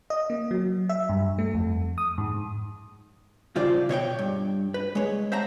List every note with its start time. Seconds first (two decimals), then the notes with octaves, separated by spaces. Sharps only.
0.10 D#5
0.30 A#3
0.51 F#3
0.89 E5
1.09 G2
1.39 A3
1.55 F2
1.98 D#6
2.18 G#2
3.56 G2 C#3 F4 C5 D5
3.89 B2 C#5 D#5 G5
4.19 G2
4.74 B4
4.95 G#3 C#5
5.32 C5 E5 F#5 A5 A#5